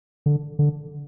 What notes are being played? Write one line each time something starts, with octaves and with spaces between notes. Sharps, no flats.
D3
D3